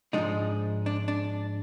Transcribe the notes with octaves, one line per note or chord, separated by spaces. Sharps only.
G#2 F3 G#3 D4 D#4
D4
D4